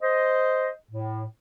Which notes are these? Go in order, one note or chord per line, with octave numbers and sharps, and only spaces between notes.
C5 D#5
A2